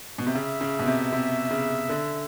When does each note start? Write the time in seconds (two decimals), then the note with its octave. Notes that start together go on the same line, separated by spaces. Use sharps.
0.18 B2
0.27 C3
0.35 C#3 E5
0.61 C#3
0.79 B2
0.87 C3
1.12 C3
1.51 C#3
1.89 D3